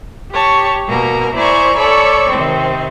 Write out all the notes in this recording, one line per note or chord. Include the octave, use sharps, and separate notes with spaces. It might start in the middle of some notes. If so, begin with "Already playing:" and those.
G4 C#5 A5 C#6
B2 A#3 A#4
E4 C5 D5 G#5 A#5 C#6
A4 C#5 D5 B5 C#6
C3 D#3 C4